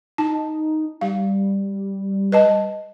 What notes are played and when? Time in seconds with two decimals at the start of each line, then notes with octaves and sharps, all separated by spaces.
0.18 D#4 A5
1.01 G3 F5
2.32 B4 D#5 A5